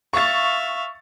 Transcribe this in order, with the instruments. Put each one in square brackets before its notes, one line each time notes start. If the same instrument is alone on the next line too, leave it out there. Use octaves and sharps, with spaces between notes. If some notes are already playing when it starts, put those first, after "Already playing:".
[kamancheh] E5 F5 [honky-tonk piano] C#6 A6